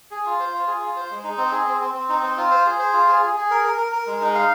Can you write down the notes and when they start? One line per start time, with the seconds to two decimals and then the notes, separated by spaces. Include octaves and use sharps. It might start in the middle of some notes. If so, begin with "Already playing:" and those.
0.11 G#4
0.26 F4
0.40 C5
0.54 F4
0.67 G#4
0.82 F4
0.96 C5
1.11 G#3
1.24 D#4
1.38 C4
1.52 G#4
1.67 C4
1.81 C4
1.94 C4
2.09 D#4
2.23 C4
2.37 F4
2.51 C5
2.66 G#4
2.79 C5
2.93 F4
3.08 G#4
3.22 G#4
3.36 G#4
3.51 A#4
3.65 A#4
3.78 A#4
3.92 A#4
4.07 G#3
4.21 D#4
4.35 F5